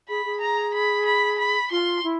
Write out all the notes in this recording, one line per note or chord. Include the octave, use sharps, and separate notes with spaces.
G#4 B5
G#4
A#5
B5
B5
B5
F4 C6
E4